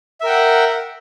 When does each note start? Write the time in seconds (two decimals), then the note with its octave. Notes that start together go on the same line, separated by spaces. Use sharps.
0.21 E5
0.23 A#4
0.26 G5
0.29 F#5